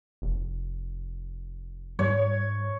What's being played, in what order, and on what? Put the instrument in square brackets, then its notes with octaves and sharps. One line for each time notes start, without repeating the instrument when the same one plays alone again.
[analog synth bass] F1
[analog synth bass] G#2 [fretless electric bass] G3 [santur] C#5